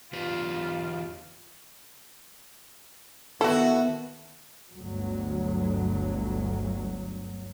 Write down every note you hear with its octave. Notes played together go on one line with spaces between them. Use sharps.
E2 F4 G4 B4
D#3 B3 E4 F#4 A4
G1 D2 F#3